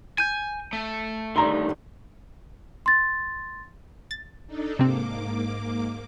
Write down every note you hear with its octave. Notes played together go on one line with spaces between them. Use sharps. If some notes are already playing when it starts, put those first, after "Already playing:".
G#5 G6 D#7
A3
D3 D#3 G3 A#5 C6
C6 A6
A6
D4 D#4 A4
G#2 C3 A#3 C4 D6